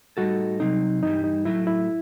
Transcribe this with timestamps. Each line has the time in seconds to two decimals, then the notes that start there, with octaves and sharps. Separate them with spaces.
0.17 A2 G3 D#4 F#4 A4
0.60 C3 F#3 C4 D#4
1.03 G2 E3 G3 D#4
1.24 D#4
1.45 A2 F#3 A3 E4
1.67 E4